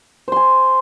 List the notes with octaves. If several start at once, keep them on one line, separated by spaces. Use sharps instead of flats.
C5 G#5 C6